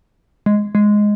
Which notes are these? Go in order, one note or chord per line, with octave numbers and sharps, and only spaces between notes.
G#3
G#3